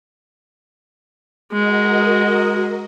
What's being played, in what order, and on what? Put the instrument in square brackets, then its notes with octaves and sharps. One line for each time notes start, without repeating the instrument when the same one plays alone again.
[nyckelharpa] G#3 [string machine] F#4 A#4 D#5